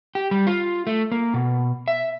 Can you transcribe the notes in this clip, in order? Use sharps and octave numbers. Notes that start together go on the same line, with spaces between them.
G4
G3
F4
A3
A#3
B2
E5